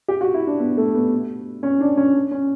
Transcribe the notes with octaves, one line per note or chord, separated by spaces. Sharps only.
G4
F#4
E4
D4
B3
A3
B3
C#4
D4
C#4
C#4